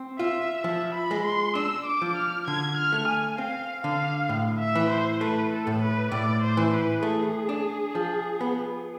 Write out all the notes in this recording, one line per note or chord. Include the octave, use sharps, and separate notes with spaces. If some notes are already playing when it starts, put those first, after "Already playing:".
Already playing: C4
F4 E5
F3 E5
B5
G#3
C6
D4 E6
D6
F3
F6
D3 G#6
F6
A3
G#5
C4 F5
D3 F5
A2
E5
E3
C5
A3 B4
A4
A2
B4
A2 D5
C5
E3
B4
A3 G#4
D4
F3
B3